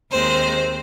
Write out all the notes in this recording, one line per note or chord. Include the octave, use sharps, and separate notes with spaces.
D#2 D#3 G#3 C4 C5